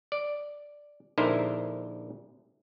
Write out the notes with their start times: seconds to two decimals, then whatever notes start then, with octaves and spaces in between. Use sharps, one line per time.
0.12 D5
1.18 A#1 D3 D#4 E4 A#4 C5